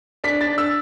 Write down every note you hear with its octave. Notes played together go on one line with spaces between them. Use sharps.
D4 B6
A6
D4
E6